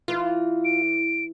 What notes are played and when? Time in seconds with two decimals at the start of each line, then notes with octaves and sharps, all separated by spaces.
0.08 E3 F4
0.65 D7